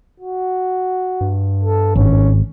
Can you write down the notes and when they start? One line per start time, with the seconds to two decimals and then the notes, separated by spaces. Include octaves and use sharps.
0.20 F#4
1.21 G2
1.63 A4
1.96 G#1 C#4